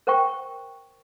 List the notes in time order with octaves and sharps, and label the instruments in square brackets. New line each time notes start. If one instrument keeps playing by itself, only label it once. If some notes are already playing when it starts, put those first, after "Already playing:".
[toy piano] A#4 C5 F#5 G5 C#6